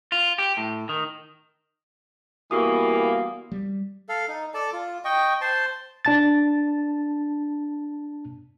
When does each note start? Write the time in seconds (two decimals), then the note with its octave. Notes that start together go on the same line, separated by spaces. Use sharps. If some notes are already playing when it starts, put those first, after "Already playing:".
0.12 F4
0.38 G4
0.57 A2
0.89 D#3
2.51 E3 G3 A#3 B3 F#4 D#6
3.52 G3
4.09 A4 F5
4.28 D#4
4.54 A4 D5 A5
4.73 F4
5.05 D#5 G5 C#6
5.41 C5 A5 C6
6.05 D4 A5 A6